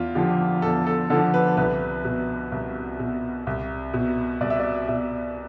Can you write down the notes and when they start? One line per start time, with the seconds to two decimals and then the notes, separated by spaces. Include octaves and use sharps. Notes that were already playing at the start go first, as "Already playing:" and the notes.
Already playing: E2 F4
0.15 D3 F3 G4
0.62 E2 A4
0.87 A4
1.10 D3 F3 A4
1.34 B4
1.57 C2 B4
2.05 B2
2.52 C2
2.99 B2
3.47 C2
3.94 B2
4.41 C2 D5
4.50 E5
4.60 D5
4.88 B2 E5